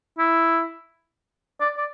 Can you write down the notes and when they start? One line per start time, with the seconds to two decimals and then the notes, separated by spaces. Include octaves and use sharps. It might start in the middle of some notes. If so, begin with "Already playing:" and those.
0.18 E4
1.61 D5
1.78 D5